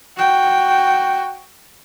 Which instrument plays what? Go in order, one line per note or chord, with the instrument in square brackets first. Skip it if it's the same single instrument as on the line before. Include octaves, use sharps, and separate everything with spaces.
[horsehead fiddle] F#4 G5